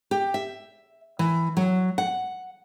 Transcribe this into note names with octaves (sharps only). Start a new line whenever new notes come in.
G4
E5
E3
F#3
F#5